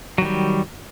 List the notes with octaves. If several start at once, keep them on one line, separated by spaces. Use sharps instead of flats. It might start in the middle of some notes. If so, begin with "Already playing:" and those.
D#3 F#3 G3